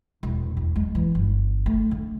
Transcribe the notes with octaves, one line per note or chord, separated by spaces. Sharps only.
E1
E2
G#3
E3
G1
A3
D3